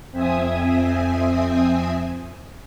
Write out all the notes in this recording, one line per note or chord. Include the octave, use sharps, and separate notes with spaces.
F2 C4 E5 G#5 D#6